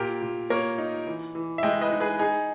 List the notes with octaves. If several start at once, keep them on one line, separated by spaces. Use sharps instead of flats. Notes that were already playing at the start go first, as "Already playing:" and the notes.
Already playing: A#2 G4 A#4
A#2
A#3 A#4 C#5
D#4
E3
E3
E5
G#3 D#5 G5
B4 D#5
D#4
G#4 B4
D#4 G#4